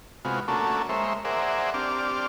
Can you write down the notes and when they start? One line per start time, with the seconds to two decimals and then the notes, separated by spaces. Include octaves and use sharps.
0.25 C3 G#3 B3 F4 F#4
0.48 A3 A#3 C#4 D4 F#4 A4
0.89 G#3 A#3 C5 C#5 E5
1.25 G#4 A#4 C5 D5 E5 F#5
1.74 C4 D4 G4 D5 F6